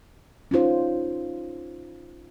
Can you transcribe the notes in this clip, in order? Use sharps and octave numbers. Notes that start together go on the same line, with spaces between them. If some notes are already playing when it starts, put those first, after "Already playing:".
C#4 D#4 F4 C5